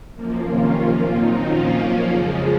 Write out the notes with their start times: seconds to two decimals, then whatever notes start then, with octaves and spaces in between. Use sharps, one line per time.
0.15 F#2 F3 A#3
0.47 C3 D#3 A#3 C#4 F4
0.80 A#2 F3 A#3 F4
1.10 D#3 F#3 C4 D#4
1.43 A#2 F3 A#3 C#4 F4
1.75 F#2 F3 A#3 C#4
2.07 F2 C#3 F3 G#3